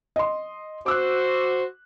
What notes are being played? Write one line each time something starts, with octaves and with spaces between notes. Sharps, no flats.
D#5 C6
F#4 C5 D6 E6 F#6